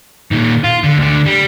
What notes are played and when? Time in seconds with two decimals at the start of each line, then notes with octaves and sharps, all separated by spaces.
0.31 A#2 D#3
0.64 F4
0.84 D3
0.98 D2 D3
1.26 G3